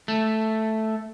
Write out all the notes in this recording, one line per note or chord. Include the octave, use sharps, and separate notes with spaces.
A3